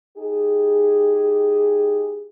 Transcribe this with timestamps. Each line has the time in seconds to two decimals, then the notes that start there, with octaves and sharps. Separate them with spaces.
0.17 D#4 G4 G#4